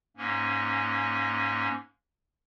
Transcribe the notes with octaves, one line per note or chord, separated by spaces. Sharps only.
G#2 A#3 C#4